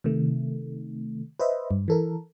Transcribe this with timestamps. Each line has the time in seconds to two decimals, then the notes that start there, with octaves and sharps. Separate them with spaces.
0.04 C3 D#3 A3
1.40 B4 C5 D#5 E5
1.71 G2
1.88 E3 A4 A#4